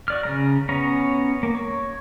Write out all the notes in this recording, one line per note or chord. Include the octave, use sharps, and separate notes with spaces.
F#4 D5 F6
C#3 A3 A#5
B3 C#4 C#5 A#5
A#3
C#5